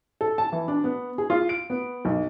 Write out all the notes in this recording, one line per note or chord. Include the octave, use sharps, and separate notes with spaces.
A4
A5
E3
D4
B3
G#4
F4
D7
B3
B1